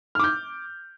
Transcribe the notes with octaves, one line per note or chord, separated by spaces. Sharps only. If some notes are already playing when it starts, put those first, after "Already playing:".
D6 F6 G6